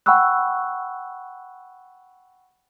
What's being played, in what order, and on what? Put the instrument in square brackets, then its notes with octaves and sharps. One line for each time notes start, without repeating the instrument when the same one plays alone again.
[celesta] F#5 G5 B5 C#6 E6 F#6